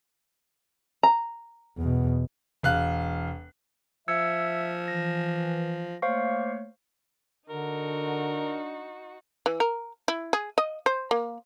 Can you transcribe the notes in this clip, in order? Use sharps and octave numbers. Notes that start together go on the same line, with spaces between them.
A#5
E2 B2
E1 F5 F#6
F3 E5 E6 G#6 C#7
E3 A#6
A3 A#3 C5 C#5 F5 C#6
D3 D4 D#4 F#4 A#4
E3
A#4
E4
G#4
D#5
C5
A#3